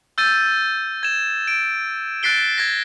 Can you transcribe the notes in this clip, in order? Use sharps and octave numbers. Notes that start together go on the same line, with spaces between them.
E6 G6 A6 D#7
G#6 E7
D7
F#6 A6 B6 C7 D7 G7
G#6 A#6